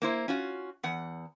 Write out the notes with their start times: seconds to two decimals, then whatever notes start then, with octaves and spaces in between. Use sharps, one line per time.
0.02 A#3 E4 C5
0.28 C#4 F4 F#4
0.83 E2 F#5